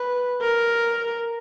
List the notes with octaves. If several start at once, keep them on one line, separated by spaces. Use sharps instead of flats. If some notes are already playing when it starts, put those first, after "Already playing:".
Already playing: B4
A#4